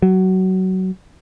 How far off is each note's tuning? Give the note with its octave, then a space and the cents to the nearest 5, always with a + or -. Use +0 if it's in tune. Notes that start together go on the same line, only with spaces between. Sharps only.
F#3 +20